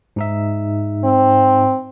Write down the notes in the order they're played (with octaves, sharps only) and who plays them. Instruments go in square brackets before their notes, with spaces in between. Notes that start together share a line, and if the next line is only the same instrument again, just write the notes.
[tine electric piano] G#2 D#4 E5
[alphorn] C4